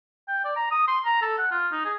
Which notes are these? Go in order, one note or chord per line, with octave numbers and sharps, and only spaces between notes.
G5
D5
A#5
D#6
C6
A#5
A4
F#5
F4
D#4
G#4